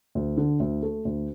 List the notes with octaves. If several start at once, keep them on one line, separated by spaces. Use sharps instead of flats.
D2
D3
D2
A3
D2